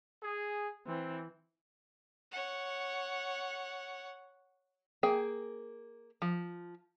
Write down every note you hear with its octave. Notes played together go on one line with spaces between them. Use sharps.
G#4
E3 C4
C#5 F#5
A#3 G#4 G5
F3